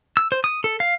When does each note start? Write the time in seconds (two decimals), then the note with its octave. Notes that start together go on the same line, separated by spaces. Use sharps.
0.17 E6
0.32 C5
0.44 D#6
0.64 A4
0.80 F5